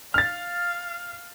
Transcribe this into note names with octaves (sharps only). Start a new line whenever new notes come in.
F5 F6 A6